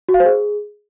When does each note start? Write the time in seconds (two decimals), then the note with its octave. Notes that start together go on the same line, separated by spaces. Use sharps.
0.09 F#4
0.14 F5
0.20 C5
0.25 G#4